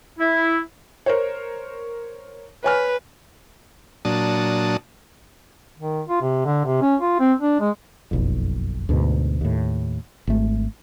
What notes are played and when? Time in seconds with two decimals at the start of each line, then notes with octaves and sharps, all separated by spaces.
0.19 E4
1.06 A#4 C5 C#5
2.64 B4 C#5 G#5 F6
4.05 A#2 F#3 D4 A5 D#6
5.79 D#3
6.09 F4
6.22 C3
6.46 D3
6.65 C3
6.82 C#4
7.01 F4
7.20 C4
7.41 D4
7.60 G#3
8.11 F#1 B1 F2
8.89 D2 G#2 B2
9.41 D#2 A2
10.27 G#1 A3